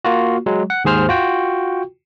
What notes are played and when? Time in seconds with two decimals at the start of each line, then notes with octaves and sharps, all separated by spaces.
0.05 A#3 F4 F#4
0.46 F#3 G#3
0.70 F#5
0.85 D#2 G#2 G#4 C5 F6
1.09 F4 F#4 G5